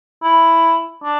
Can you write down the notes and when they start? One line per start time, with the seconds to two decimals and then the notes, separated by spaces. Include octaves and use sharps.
0.23 E4
1.04 D4